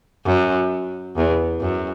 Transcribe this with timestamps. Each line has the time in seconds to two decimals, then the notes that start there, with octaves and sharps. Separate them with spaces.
0.26 F#2
1.17 E2
1.61 F#2